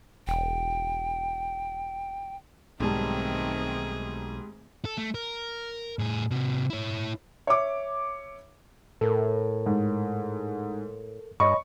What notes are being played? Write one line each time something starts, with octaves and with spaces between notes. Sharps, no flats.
E1 G5
B1 G#2 D#3 G3 A3 C4 G#4 A5
A4
A3
A#4
A2 G#4
C3 F#4
E4 C#5
C#5 E5 D6
A2 A4 A#4
G#2
G2 C#5 D#5 B5 C#6